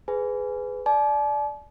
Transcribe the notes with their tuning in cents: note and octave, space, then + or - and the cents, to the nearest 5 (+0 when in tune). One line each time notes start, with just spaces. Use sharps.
G#4 +5 B4 +20 G#5 +0
D5 +0 A5 -45